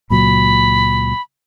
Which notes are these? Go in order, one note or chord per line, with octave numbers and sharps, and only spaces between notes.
C#2 A#2 F#3 B5